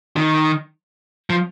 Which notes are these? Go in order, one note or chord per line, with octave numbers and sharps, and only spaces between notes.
D#3
F3